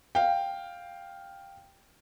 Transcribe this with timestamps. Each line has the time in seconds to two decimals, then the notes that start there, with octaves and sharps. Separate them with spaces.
0.15 F5 G5